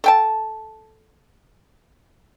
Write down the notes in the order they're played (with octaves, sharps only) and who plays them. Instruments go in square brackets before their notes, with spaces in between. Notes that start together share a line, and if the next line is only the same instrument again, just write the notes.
[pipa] A4 G5 A5